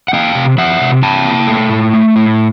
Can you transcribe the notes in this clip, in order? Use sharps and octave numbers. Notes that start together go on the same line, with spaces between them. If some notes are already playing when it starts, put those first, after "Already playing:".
F#5
A#3 F5 G5
C3
F3 E5 F#5
C3
C3 G5 A5
A#3
A3
A2
A3
A2